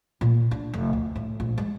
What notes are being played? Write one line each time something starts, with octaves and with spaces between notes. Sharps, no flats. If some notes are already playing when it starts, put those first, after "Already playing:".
A#2
D4
F1
D2
A2
A#1
G#3